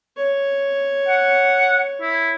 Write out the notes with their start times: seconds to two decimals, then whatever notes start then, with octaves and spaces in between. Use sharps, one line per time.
0.17 C#5
1.08 F#5
2.02 E4